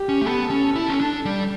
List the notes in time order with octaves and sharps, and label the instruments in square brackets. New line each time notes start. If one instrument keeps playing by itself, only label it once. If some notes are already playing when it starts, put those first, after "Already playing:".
Already playing: [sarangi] G4
[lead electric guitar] C#4
A3
[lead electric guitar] B3 [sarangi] A4
[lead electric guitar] C#4
E4
C#4
D4
G3